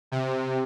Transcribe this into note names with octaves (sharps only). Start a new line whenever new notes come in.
C3